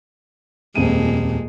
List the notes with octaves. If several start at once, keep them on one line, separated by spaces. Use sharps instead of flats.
D#1 F2 A#2 G#3 D#7